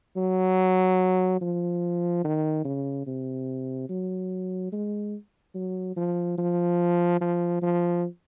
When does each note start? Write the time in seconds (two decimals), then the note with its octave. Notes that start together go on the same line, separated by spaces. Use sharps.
0.17 F#3
1.41 F3
2.25 D#3
2.65 C#3
3.07 C3
3.89 F#3
4.72 G#3
5.55 F#3
5.97 F3
6.38 F3
7.21 F3
7.62 F3